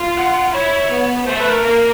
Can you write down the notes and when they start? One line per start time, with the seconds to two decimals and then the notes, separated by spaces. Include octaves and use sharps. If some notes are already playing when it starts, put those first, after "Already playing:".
Already playing: F4
0.17 F#5
0.54 E4 C#5
0.90 B3
1.25 A3 C5
1.39 B4
1.50 A#4
1.63 A#3